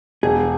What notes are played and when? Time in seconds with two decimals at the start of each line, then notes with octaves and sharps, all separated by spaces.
0.23 E1 G#4